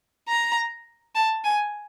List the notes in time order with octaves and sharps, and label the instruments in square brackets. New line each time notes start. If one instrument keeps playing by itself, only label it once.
[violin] A#5
A5
G#5